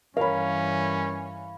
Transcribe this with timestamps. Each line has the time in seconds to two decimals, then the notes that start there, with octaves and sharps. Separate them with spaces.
0.17 G2 E3 C#4 A#4 C#5 F5 B5